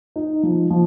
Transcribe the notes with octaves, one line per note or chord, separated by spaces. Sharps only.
D#4
F3
F3